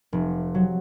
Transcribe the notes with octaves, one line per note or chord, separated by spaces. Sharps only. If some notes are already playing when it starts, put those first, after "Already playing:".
F1
F#3